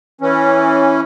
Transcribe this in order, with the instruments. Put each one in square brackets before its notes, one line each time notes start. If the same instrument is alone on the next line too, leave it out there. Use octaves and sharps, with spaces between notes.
[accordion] E3 C#4